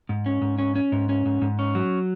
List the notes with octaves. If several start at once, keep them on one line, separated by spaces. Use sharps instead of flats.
G#2
C#4
G#2
C#4
C#4
G#2
C#4
G#2
G#2
C#4
F#3